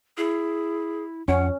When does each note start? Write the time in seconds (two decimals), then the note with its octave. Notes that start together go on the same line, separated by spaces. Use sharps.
0.17 E4 G#4
1.28 F2 C#4 F#5